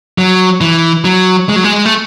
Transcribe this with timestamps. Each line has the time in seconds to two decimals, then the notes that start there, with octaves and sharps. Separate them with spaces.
0.18 F#3
0.61 E3
1.05 F#3
1.49 G#3
1.56 F#3
1.64 G#3
1.86 A3